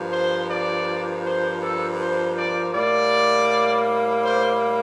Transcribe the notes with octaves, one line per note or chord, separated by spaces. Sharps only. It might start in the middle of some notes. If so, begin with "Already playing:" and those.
Already playing: G2 F3 A#3
C5
D5
C5
A4
C5
D5
A2 G3 A#3 D5
C5